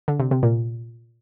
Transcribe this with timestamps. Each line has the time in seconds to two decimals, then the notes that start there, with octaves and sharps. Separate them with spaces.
0.08 D3
0.20 C3
0.31 C3
0.43 A#2